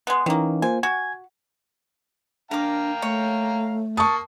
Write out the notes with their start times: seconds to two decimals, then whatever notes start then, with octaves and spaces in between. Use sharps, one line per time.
0.07 G#3 B3
0.26 D#3 E3 A#3 C#4 D#4
0.62 A#3 F4 C5 G#5
0.83 F#4 G#5 G#6
2.51 D4 A#4 F5 G5 A#5 D6
3.02 A3 C#5
3.97 A#3 A5 C#6 D#6